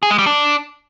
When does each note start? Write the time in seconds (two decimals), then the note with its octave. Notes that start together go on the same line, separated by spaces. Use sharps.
0.03 G#4
0.10 G#3
0.18 G3
0.26 D4